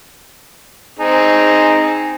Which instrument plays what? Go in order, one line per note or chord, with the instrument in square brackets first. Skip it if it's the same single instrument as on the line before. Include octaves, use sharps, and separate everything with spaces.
[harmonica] C4 D#4 G#4